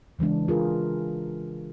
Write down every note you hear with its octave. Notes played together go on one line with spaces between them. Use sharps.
C#3 E3 G#3 D4
F4 G#4 A#4